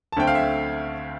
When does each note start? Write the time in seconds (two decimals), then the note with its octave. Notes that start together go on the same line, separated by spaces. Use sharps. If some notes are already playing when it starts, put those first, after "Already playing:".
0.12 A5
0.17 D2 D3 A3 C4 G5
0.27 F5
0.35 E5